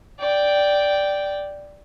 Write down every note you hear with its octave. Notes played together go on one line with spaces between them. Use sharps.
D5 G5